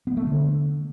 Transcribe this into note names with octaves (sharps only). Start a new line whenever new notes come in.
B3
A3
D3